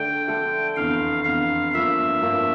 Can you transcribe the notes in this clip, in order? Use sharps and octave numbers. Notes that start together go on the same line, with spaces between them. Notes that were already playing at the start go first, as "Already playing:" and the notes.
Already playing: D3 A3 D4 A4 G5
D3 A3 D4 A4
F1 E2 D3 F5
F1 E2 D3 F5
G1 G2 F3 A#3 F4 E5
G1 G2 F3 A#3 F4